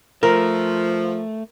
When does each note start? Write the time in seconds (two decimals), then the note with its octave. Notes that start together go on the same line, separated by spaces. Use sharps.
0.23 F3 A3 A#4